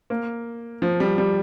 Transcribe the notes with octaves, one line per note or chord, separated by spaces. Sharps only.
A#3
F3
G3
G3